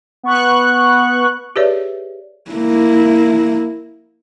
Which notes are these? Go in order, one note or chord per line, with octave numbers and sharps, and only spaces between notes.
B3 C#6 F#6
G4 G#4 B4 C#5 D5 E5
A#3 E4